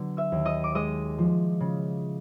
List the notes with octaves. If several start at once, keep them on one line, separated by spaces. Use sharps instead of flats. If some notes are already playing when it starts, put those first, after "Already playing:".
Already playing: D3 F#3 B3
E5 E6
D#2
D#5 D#6
D6
G#3 D#5 D#6
F3
C#3